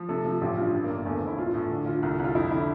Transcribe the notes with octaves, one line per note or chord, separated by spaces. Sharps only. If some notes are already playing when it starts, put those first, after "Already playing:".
Already playing: F3
C3 A4
F3
A1 G4
G2 F4
G2
A#3
G1
E2 A3
C4
E2
E4
A#1 F4
A2 A4
D3
D3 F4
C2
C2 F4
F2 E4
D3 E4